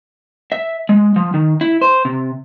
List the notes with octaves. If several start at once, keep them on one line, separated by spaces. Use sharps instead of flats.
E5
G#3
F3
D#3
E4
C5
C3